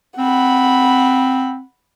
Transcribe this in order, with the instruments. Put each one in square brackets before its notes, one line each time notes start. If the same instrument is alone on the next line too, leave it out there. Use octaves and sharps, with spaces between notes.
[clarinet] C4 [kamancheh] F#5 B5